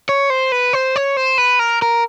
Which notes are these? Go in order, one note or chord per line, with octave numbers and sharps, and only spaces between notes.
C#5
C5
B4
C5
C#5
C5
B4
A#4
A#4